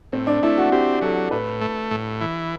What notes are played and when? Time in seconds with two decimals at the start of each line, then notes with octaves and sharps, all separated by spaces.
0.12 A2 C4
0.27 D4
0.43 A3 E4
0.57 F#4
0.72 C4 G4
1.02 F#3 A4
1.31 A2 B4
1.61 A3
1.91 A2
2.21 E3